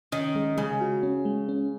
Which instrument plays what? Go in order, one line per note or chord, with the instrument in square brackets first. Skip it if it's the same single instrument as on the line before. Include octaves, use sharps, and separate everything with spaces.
[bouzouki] D#3 [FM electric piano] C#4
[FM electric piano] G#3
[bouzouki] C#3 [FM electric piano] G#3
[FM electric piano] F#4
C#4
G#3
C#4